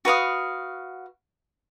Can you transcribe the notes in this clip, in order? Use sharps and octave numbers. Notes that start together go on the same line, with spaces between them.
F#4 B4 F5 D#6